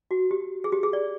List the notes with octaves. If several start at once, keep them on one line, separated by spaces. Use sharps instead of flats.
F#4
G4
G#4
G4
G#4
D5